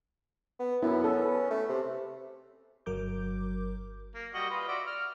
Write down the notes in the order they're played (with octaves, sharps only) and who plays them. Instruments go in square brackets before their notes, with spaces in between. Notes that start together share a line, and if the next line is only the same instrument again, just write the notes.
[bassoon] B3
[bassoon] F#2 [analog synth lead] B3 [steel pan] E4
[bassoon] C#4 [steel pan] A4
[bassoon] A3
C3
[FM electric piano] G1 F#3 A#4 D6 G6
[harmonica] A#3
G3 F#4 D#5
F4 B4 D#5
F#4 D5 E5
F6